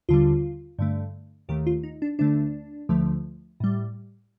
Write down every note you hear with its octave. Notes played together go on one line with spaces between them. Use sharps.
D#2 D3 G3 F4
G2 D3 A3
D#2 D#3 A3 G4
F4
D#4
D4
D2 D3 A3 D4
D2 D3 F3 A3
A2 G3